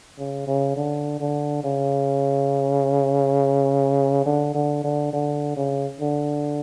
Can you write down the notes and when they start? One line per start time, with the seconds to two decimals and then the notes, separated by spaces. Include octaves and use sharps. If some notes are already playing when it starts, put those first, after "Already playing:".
0.18 C#3
0.47 C#3
0.76 D3
1.20 D3
1.64 C#3
4.26 D3
4.55 D3
4.84 D3
5.13 D3
5.57 C#3
6.00 D3